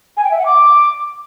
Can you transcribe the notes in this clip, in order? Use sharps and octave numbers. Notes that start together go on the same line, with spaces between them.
G#5
G5
E5
F#5
D6